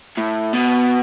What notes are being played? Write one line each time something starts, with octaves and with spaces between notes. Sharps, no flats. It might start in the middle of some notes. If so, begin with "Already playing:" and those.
A2
B2